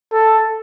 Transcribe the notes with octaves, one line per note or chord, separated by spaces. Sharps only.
A4